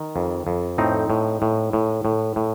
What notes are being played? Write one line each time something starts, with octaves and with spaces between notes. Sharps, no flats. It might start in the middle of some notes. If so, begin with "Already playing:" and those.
Already playing: D#3
F2
F2
A2 C4 D#4
A2
A2
A2
A2
A2